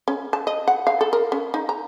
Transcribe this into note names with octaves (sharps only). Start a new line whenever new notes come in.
C#4
A5
D#5
F#5
F5
A4
A#4
C#4
D#4
A#5